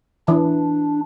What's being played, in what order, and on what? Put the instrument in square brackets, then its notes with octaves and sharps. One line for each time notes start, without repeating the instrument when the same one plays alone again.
[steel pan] E3 [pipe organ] D4